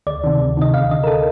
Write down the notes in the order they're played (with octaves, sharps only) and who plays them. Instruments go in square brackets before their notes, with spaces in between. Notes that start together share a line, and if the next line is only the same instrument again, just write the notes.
[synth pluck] D2 D5
C3 D#3
D2
C3 D#3 D#5
D2 F5
D3 D#5
A#4
A4